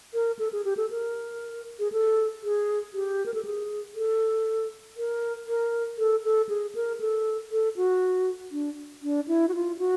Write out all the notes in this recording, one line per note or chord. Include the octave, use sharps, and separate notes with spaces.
A#4
A4
G#4
G4
A4
A#4
G#4
A4
G#4
G4
A#4
A4
G#4
A4
A#4
A#4
A4
A4
G#4
A#4
A4
A4
F#4
D4
D4
E4
F#4
F4
F#4